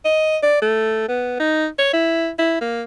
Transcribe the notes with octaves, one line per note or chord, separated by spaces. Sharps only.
D#5
D5
A3
B3
D#4
C#5
E4
E4
A#3